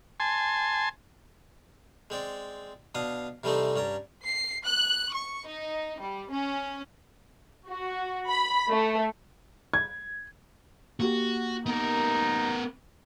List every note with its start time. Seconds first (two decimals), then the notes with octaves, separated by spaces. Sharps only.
0.20 G#5 A5 C6
2.10 G#3 C4 D5
2.95 B2 D4 F5 D#6
3.44 C3 E3 G3 A3 C4 D#4
3.76 G2 C#4 D5 A#5
4.25 C7
4.66 F#6
5.13 C#6
5.46 D#4
6.01 G3
6.31 C#4
7.68 F#4
8.29 B5
8.70 A3
9.74 G#6
11.00 A#3 F#4 G4
11.66 B3 D#4 A#4